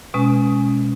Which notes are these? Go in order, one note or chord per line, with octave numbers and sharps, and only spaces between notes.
B2 G#3 C#4